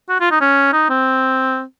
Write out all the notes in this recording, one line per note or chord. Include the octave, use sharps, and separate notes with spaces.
F#4
F4
D#4
C#4
D#4
C4